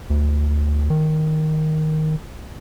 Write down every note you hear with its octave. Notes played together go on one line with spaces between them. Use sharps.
D2
D#3